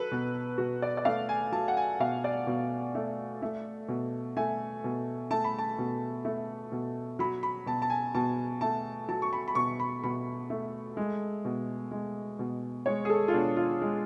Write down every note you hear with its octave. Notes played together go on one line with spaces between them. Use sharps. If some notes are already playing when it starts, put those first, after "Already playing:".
Already playing: F#3 A4 B4
B2
B2 F#4
D5
D5
A3 F5
G#5
F#3 A5
F#5
G#5
B2 F5
D5
B2
A3
A3
B2
A3 G#5
B2
A3 A5
B5
A5
B2
A3
B2
F#3 B5
B5
B2 A5
A5
G#5
B2 A5
A3 A5
F#3 A5
C#6
B5
B5
B2 C#6
B5
B2 B5
A3
G#3
B2
G#3
B2
G#3 C#5
G#4
A4
F4
B2 D4
F4
G#3